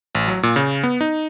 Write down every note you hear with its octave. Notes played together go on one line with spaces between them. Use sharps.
A1
F#3
A#2
C#3
B3
D#4